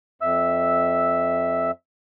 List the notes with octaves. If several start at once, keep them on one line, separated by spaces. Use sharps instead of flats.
F2 E5 E6